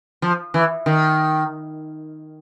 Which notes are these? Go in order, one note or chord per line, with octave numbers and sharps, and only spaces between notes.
F3
E3
D#3